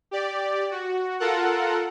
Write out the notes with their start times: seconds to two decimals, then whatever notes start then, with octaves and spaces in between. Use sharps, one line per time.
0.11 G4 D5
0.71 F#4
1.20 F4 A4 A#4 F#5